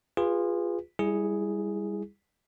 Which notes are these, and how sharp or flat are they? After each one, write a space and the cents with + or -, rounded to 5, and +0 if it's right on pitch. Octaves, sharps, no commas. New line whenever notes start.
F4 +0 G#4 -25 B4 +0
G3 +25 E4 +0 G#4 +0